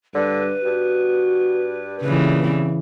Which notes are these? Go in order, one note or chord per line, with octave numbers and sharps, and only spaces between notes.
G2 D3 B4
G2 F#4
A#2 C#3 E3 B4
C4